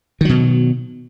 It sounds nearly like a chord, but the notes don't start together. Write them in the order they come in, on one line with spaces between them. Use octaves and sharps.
D#3 F#3 B2